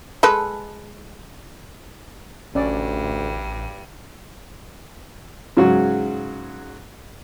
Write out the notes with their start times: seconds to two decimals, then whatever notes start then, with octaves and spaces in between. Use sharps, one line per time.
0.23 G#3 A4 B4
2.55 A1 D2 G2 C#4 D5
5.57 G#2 C#3 F#3 F#4